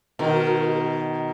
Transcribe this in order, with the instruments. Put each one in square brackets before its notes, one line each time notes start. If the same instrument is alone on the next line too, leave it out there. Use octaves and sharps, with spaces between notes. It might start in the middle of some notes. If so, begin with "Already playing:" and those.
[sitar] B2 D#3 [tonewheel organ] F#4 A#4